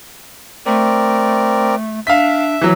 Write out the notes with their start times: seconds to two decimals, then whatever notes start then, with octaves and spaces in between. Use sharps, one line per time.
0.66 A3 C4 A#4 D5
2.07 D4 E5 F5 B6
2.61 E3 F#3